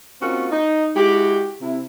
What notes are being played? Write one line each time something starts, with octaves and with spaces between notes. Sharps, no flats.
A#3 C4 C#4 D#4 F4 F#4
D#4
G#3 E4 F#4 G4
C3 E4